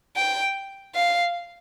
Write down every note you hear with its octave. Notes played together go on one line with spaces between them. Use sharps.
G5
F5